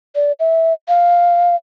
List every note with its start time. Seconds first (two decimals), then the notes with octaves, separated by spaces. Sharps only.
0.15 D5
0.40 E5
0.88 F5